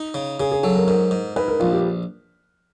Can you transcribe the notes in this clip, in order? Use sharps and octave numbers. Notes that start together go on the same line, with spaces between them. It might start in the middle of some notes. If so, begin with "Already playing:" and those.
Already playing: D#4
C#3
C#3 G#4
G#4
F#3 A4
A#4
G#2 A#4
G#2
G#2 B4
A#4
A#1 F4
G4